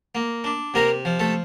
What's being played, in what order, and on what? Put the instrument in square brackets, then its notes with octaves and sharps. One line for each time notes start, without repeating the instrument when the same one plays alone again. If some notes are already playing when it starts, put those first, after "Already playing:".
[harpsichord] A#3
D4
C3 A#3 A#4
F3
A3 A4